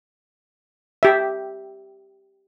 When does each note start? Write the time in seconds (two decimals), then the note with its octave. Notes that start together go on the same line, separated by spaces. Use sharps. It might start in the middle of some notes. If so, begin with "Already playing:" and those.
1.03 G4 E5